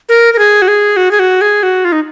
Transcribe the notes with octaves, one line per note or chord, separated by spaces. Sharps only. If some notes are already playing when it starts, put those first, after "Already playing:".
A#4
A#4
G#4
F#4
G#4
F#4
G#4
F#4
G#4
F#4
F4
D#4